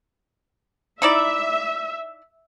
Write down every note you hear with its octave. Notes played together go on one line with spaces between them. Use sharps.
D#4 E4 D5 E5